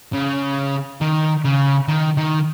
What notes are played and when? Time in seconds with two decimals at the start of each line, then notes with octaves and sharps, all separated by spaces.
0.13 C#3
1.01 D#3
1.44 C#3
1.88 D#3
2.18 D#3